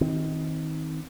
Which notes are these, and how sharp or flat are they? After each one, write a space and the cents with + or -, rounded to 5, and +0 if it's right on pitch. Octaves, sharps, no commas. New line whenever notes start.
D#3 +25 C4 +0